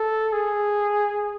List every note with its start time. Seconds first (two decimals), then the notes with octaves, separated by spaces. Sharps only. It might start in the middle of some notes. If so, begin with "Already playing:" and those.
Already playing: A4
0.33 G#4